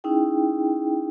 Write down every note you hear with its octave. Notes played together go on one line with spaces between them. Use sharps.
C#4 D#4 E4 G#4 G5